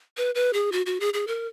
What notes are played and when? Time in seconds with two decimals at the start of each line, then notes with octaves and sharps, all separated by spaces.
0.17 B4
0.35 B4
0.53 G#4
0.72 F#4
0.86 F#4
1.00 G#4
1.14 G#4
1.27 A#4